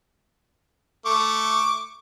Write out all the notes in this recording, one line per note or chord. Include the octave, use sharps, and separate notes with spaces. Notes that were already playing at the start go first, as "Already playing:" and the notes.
A3 C#6 D6